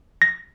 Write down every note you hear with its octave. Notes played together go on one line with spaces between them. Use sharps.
A#6